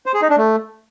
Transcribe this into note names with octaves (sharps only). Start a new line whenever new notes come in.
C5
G#4
D#4
D4
A3